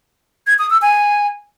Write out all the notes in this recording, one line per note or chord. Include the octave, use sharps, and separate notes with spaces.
G#6
D#6
E6
G#5